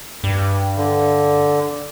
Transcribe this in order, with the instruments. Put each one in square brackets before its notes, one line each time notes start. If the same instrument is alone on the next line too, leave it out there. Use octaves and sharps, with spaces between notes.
[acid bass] G2
[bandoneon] D3